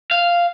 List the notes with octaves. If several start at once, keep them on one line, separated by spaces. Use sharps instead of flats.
F5